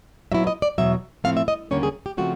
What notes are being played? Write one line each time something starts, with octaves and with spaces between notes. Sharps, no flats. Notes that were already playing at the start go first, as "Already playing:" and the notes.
A#2 F#3 B3 E4 E5
D#5
D5
E2 B2 F#3 E5
A2 F3 A3 C4 F5
E5
D#5
D#2 D3 G3 A#3 C#4 C#5
G#4
G4
C#3 F3 A3 C4 F#4